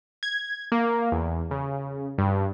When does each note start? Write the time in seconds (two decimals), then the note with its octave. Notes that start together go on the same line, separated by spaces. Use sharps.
0.23 G#6
0.72 A#3
1.12 E2
1.51 C#3
2.18 G2